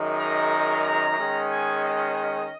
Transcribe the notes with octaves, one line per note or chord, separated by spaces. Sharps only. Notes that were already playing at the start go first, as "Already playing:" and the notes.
Already playing: F#2 D#3 G#3
A#5
A#5
D#3 G#3 C#4
G#5
D#5